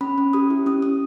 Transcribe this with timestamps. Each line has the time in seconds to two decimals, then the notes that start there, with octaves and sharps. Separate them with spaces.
0.01 C#4 B5
0.18 C#4
0.33 G4 D#6
0.50 E4
0.66 C#4 D#6
0.82 C#4 D#6